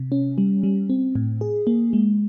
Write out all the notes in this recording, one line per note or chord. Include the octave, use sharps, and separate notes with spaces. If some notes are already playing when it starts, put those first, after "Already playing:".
Already playing: C3
C#4
G3
G3
C4
A2
G#4
A#3
G#3